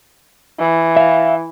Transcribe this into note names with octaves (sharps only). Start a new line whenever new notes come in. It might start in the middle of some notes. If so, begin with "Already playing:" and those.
E3
E5 F5